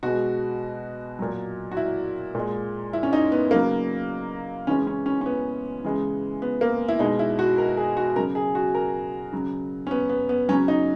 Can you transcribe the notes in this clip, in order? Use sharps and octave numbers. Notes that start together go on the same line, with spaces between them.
B2 G#3 F#4
A#2 F#3
F#4
E4
A#2 G#3
E4
C#4
D#4
B3
C#3 F#3 A#3
C#3 E3 G#3 C#4
C#4
C#4
C#4
B3
C#3 E3 G#3
B3
A#3
E4
B2 G#3 D#4
E4
F#4
A#4
G#4
F#4
C#3 F#3 A#4
G#4
F#4
A#4
C#3 F#3
C#4
B3
B3
B3
C#3 F#3 C#4
D#4